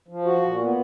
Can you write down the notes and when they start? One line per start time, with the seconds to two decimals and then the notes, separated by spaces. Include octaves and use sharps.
0.08 F3
0.25 F#4
0.42 A#2
0.60 B3